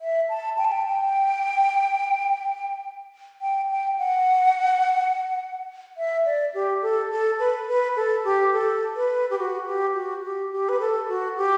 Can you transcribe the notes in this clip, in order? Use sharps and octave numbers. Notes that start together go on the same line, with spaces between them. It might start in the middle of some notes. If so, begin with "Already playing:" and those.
E5
A5
G5
A5
G5
G5
G5
G5
F#5
E5
D5
G4
A4
A4
B4
B4
A4
G4
A4
B4
G4
F#4
G4
F#4
G4
G4
B4
A4
F#4
G4